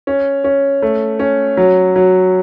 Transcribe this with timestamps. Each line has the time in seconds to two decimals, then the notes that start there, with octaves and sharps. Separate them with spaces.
0.07 C#4
0.44 C#4
0.82 A3
1.19 C#4
1.57 F#3
1.96 F#3